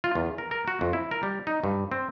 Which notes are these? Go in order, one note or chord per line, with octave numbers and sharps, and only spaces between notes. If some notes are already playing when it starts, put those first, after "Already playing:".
F4
E2
A#4
A#4
F#4
F2
E4
A#4
G3
D#4
G2
C4